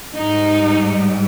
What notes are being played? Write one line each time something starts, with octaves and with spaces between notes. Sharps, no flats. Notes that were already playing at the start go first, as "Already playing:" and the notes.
G#2 G3 D#4